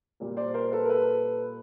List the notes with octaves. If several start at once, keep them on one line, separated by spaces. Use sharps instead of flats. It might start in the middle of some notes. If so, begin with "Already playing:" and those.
A#2 G3 A#3
C5 D5
A#4 C5
A4 B4
A#4
A4 B4